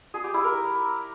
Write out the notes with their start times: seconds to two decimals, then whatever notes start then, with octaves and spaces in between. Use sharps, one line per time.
0.14 G#4
0.24 G4
0.34 E4
0.44 A#4